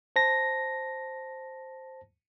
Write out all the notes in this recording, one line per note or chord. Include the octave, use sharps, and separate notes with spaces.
C5 A5 A#6